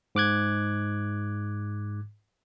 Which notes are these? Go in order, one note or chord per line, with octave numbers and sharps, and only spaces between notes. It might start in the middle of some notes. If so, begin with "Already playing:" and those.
G#2 D6 F#6 G#6